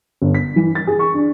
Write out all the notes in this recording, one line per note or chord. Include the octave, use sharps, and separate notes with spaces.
G1
B6
E3
A6
G#4
C#6
D4